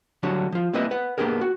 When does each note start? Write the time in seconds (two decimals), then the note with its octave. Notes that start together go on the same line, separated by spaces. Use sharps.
0.23 D3 F#3 G3 D4 F#4 C#5
0.52 F3 F4
0.73 G3 A#3 C4 E4 B4 D#5
0.91 B4 F#5
1.18 A#3 B3 D4 G4 G#4 A#4
1.41 F#4